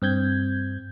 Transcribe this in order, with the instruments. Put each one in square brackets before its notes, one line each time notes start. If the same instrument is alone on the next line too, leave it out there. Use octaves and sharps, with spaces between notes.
[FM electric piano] G2 C4 G6 G#6